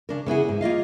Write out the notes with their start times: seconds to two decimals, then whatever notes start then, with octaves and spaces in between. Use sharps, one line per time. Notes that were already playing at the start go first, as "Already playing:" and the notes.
0.09 C#3 D4 A#4
0.26 C#3 B3 E4 G#4
0.48 G#2
0.61 A#3 F4 D#5 F5